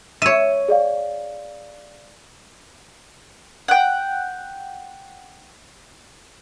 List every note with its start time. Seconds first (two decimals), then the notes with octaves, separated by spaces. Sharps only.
0.22 C#5 E5 D#7
0.68 G#4 D5 F5
3.68 F#5 G5